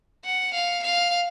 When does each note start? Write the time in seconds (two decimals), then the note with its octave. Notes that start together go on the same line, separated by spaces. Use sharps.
0.25 F#5
0.54 F5
0.83 F5